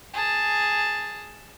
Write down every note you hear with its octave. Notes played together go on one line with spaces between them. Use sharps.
G#4 A5